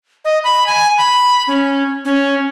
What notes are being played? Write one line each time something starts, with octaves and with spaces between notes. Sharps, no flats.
D#5
B5
G#5
B5
C#4
C#4